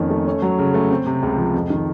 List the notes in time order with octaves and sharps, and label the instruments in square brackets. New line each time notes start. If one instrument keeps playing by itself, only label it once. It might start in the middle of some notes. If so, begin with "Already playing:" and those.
Already playing: [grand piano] F2 D#3 A#3 C#4
A3
C#4
F#3
C#3
A3
C4
C3
C#2
F3
F2
D#3